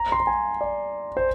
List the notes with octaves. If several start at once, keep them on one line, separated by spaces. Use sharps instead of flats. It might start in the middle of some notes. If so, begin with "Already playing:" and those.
Already playing: A#5
C6
A#5
G#5
D5
C5